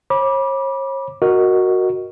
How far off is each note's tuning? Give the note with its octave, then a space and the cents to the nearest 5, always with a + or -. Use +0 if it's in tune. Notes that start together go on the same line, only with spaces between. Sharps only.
C#5 -40 B5 -30 D6 +0
F#4 +0 A#4 -5 D#5 +0